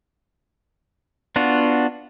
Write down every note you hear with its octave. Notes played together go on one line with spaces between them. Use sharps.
B3 D4 F4 F#4